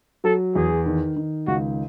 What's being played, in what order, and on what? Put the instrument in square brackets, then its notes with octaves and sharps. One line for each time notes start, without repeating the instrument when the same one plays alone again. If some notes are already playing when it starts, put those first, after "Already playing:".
[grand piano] F#3 [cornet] A4
[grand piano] E2 [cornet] G#4
[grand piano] D#3
D#3
[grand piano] C#2 [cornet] F#4